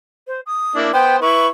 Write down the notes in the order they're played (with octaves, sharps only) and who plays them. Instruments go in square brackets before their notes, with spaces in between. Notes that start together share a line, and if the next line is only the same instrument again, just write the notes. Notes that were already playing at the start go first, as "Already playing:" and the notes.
[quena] C5
D#6
[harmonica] A#3 D4 E4
[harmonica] B3 C5 [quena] G5
[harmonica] E4 B4 [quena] C#6